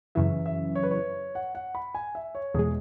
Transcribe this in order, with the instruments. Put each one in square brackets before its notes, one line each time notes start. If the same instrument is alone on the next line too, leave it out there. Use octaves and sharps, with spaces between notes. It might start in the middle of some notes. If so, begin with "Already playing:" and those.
[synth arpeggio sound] F#2 C#3 E3 [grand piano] E5
[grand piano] E5
C#5
B4
C#5
F#5
F#5
B5
G#5
E5
C#5
[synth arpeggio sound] E2 B2 G#3 [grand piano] G#4